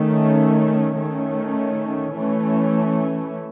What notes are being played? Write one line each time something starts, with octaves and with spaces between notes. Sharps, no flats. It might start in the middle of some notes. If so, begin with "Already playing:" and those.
Already playing: D#3 A3 C#4
D#3 A3 C#4
E3 A3 C#4